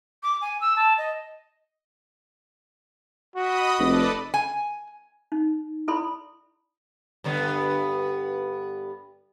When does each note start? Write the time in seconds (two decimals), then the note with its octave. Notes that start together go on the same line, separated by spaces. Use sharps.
0.23 D6
0.41 G#5
0.61 E6
0.76 A5
0.98 D#5
3.35 F#4 D#5 B5 D#6
3.79 F1 A4 B4 D5
4.34 G#5
5.32 D#4
5.88 E4 A4 D5 B5 C6
7.24 G2 D3 B3